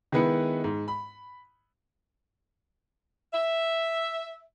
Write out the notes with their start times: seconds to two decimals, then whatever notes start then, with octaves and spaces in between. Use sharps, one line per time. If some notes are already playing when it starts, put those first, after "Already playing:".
0.12 D#3 G#3 B3 E4 B4 C#7
0.64 G#2
0.88 B5
3.32 E5